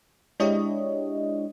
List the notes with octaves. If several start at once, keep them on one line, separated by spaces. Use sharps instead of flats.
G#3 D4 E4 G4 C#5 D#5